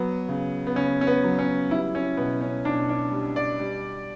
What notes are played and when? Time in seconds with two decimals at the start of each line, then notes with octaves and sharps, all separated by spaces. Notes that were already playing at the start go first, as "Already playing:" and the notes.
Already playing: F#3 B3
0.29 C#3
0.67 B3
0.76 C#3 C#4
1.01 C#4
1.07 B3
1.23 F#3
1.39 C#4
1.71 G3 E4
1.95 C#4
2.17 B2 B3
2.41 C#4
2.65 B2 D4
2.89 D4
3.12 G3
3.36 D5
3.60 G3